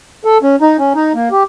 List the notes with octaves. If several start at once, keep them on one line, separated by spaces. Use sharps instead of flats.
A4
C#4
D#4
C#4
D#4
A#3
G4